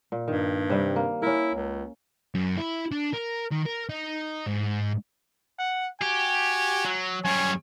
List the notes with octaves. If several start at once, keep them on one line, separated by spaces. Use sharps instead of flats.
A#2
G2 D#3
C3 G3
A#3
C#4 E4 A#4
C#2
F#2
E4
D4
A#4
D#3
A#4
D#4
G#2
F#5
F#4 G4 G#5
F#3
F#2 G3 C#5 G#5